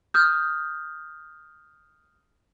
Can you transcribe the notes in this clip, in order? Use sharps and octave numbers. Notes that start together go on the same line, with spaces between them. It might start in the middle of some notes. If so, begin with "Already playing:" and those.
D#6 F6 G6